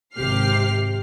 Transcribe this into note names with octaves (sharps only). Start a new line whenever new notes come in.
G#1 C3 G4 F6 C7